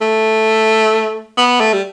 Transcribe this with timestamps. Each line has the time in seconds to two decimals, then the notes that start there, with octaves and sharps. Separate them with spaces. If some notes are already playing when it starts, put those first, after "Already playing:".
0.01 A3
1.38 B3
1.61 A3
1.73 G3